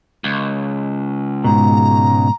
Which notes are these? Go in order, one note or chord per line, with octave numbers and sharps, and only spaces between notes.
C#2
G#2 B2 A#5